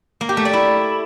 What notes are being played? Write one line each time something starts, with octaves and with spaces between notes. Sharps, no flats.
A#3
G4
A3
D5
E4